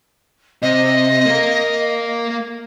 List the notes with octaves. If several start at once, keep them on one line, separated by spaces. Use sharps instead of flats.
C3 D#5
A#3 A#4